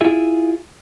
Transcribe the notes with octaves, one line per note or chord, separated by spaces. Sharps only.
E4 F4 G#4 E5